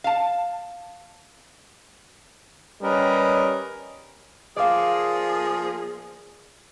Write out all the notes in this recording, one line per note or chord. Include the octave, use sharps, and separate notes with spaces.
F5 A5
G3 C#4 A#4 B4 D#5
F3 A#3 G#4 D5 F5